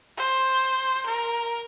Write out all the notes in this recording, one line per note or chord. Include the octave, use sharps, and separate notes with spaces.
C5
A#4